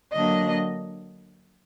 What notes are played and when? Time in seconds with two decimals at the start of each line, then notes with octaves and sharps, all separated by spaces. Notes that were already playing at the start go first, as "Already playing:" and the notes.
0.12 D3 F#3 A#3 D4 D#5